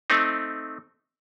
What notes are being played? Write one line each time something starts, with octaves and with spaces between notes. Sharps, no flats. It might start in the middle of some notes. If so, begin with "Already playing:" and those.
A3 C4 D#4